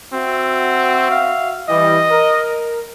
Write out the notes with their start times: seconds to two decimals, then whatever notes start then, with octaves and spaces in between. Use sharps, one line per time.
0.13 C4 F#4 E5
1.11 F5
1.69 E3 G3 D#5
2.11 A#4